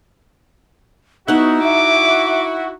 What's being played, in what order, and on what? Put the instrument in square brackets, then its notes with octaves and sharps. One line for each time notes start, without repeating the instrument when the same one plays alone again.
[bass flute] B3 [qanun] D#4 F#5 [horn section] E4 F#4
[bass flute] E5 [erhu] D6